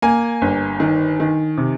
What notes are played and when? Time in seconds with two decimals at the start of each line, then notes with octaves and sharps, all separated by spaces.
0.02 A#3 G#5
0.42 G1
0.80 D#3
1.20 D#3
1.57 C3